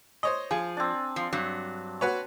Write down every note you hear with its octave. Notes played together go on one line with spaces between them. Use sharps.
C5 C#5 D#5
F3 G#4
C4 D4
F3
G2 F#3
F#4 B4 C#5